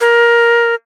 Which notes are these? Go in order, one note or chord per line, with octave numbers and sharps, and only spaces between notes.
A#4